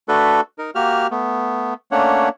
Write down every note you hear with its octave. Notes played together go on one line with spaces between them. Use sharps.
A3 D4 F#4 A4 B4
D#4 A#4
A#3 F#4 G4 F6
A3 B3
A3 A#3 C#4 D4 C#5 F#5